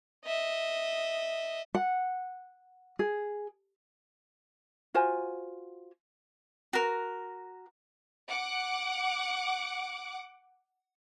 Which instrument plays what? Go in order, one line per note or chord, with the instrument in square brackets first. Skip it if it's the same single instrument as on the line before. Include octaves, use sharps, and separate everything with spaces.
[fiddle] D#5 E5
[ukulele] F#5
G#4
F4 F#4 C5 G#5
[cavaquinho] F#4 A#4
[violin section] F#5 D6